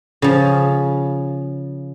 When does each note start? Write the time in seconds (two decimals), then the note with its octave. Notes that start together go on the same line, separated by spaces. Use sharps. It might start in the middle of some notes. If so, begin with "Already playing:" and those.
0.22 C#3 F3